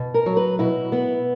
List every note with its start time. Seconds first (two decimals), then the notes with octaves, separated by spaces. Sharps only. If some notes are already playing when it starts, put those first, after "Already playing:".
Already playing: B2
0.14 A#4
0.26 F#3
0.37 B4
0.59 B2 E4
0.92 B3